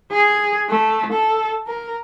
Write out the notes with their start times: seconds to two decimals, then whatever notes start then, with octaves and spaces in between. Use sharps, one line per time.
0.11 G#4
0.69 A3
1.13 A4
1.67 A#4